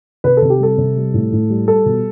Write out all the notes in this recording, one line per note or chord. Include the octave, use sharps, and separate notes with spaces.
C3 B4
A4
C3
G4
G3 A4
C3
G3
A2
A2
G3
G3 A4
B2